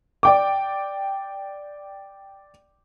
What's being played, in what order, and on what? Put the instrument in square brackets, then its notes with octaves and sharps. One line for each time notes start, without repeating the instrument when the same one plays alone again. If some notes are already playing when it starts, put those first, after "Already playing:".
[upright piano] D5 G5 D6